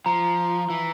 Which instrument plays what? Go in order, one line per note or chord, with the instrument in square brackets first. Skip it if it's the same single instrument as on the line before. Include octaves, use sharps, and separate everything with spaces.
[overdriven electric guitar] F3 [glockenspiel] A#5
[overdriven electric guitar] E3